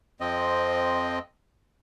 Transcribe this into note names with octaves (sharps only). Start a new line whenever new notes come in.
F2 F3 C4 D#5